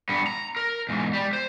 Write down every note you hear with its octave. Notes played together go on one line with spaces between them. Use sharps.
G2 B3
A#5
A#4
E2 G#2
G3
C5